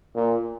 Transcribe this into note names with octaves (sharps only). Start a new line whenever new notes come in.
A#2